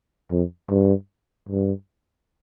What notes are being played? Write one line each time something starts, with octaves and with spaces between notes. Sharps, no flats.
F2
G2
G2